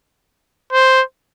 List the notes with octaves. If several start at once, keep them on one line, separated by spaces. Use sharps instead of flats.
C5